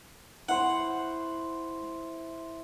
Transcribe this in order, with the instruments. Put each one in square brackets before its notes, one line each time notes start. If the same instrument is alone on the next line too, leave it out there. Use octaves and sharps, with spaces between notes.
[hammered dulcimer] E4 C5 C#6 [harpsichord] F#5